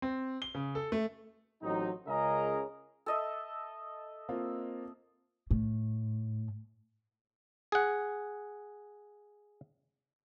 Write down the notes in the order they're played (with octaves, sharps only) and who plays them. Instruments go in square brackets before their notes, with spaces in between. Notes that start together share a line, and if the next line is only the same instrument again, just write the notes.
[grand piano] C4
G7
C#3
A4
A3
[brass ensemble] A1 F#3 C4 D#4
C#2 C#3 G#4 A#4 D#5 A#5
[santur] A4 D#5 E5
[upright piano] A#3 C4 F4
[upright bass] A2
[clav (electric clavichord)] G#4 F#5